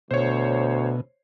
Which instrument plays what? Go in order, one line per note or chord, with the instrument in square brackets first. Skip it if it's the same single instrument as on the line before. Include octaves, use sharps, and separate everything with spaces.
[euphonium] D2 [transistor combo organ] B2 [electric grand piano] C5 C#5